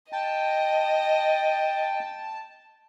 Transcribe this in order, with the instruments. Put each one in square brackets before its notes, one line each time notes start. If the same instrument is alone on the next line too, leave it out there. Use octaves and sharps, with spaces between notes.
[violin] D#5 [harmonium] G5 [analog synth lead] A5